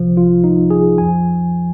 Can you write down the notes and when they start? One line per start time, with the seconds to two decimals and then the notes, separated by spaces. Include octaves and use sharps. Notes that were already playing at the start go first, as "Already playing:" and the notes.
Already playing: C2 C3 F3
0.17 F4
0.44 D#4
0.70 G#4
0.97 F2 F3 G#5